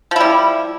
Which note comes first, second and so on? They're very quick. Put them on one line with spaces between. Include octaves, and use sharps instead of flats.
F3 E4 G3